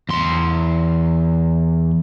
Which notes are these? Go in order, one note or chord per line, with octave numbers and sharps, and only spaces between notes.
E2 C6